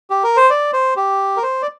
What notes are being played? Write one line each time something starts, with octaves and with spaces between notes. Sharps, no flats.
G4
A#4
C5
D5
C5
G4
A#4
C5
D5